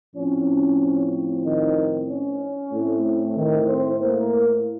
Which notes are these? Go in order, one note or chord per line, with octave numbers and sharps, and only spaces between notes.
A2 F3 C4 C#4
D#3 D#4
C#4
A2 A3 C4
D#3 D#4
C4 C5
A#3 A#4